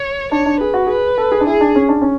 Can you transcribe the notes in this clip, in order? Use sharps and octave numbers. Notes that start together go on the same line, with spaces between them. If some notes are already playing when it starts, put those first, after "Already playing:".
Already playing: C#5
D4 C#5
D4
G#4 B4
F#4
G#4 B4
A4
G#4
D4
E4 G#4
D4
C#4
D4
C#4